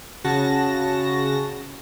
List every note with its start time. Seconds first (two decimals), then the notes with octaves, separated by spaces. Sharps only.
0.24 C#3 F#4 A5 A#6